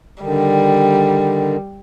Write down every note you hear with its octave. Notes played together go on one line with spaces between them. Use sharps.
D3 D#3 G3